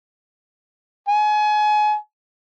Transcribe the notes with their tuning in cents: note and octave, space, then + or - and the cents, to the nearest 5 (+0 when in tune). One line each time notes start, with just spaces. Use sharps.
G#5 +30